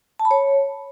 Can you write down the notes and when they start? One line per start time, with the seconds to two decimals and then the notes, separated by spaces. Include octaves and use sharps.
0.20 A5
0.25 B5
0.31 C#5